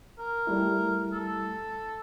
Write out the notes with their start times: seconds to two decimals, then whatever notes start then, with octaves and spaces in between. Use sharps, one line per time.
0.19 A#4
0.47 G3 A3 E4
1.12 A4